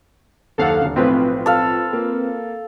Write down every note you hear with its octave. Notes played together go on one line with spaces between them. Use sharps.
F#1 D#2 A4 F5 F#5
D#1 D3
B1 A2 F3 C4 F4 B4
A4 F5
A#3